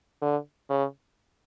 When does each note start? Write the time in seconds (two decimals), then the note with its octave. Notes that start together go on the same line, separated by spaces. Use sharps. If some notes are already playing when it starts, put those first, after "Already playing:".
0.22 D3
0.70 C#3